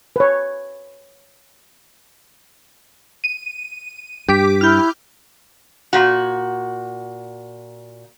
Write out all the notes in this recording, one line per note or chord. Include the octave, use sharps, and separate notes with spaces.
B4 C#5
D#7
G2 G4 D6 B6
E4 F6 G6
A#2 F#4